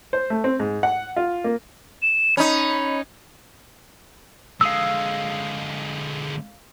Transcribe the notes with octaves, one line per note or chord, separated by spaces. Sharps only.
C5
A3
C4
G#2
F#5
F4
A#3
E7
C#4 D#4 B5
D3 G#3 F5 D#6 E6